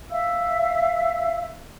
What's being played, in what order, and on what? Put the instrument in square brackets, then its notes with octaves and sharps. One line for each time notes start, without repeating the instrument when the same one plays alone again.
[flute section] E5 F5 E6